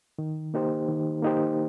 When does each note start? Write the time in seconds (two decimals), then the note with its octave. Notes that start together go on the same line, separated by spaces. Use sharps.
0.18 D#3
0.54 A#3 D#4 G4 C5
0.88 D#3
1.22 A#3 D#4 G4 C5